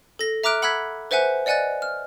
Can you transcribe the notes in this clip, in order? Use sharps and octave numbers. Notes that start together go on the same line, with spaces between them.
A4 A#6
E5 A#5 D6 F6 F#6 D7
F#5 B5 E6 F#6 G#6 B6
B4 C5 E5 F#5 G#5 F#6
D5 D#5 F#5 G#5 F#6 A6
F6